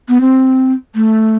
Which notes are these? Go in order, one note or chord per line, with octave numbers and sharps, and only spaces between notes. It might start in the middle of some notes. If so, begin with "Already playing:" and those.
B3
C4
A3